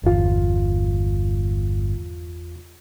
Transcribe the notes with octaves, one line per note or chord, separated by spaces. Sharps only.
G1 E2 F4